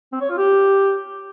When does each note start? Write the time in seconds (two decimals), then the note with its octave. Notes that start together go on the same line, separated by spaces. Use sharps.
0.12 C4
0.21 C#5
0.29 F4
0.38 G4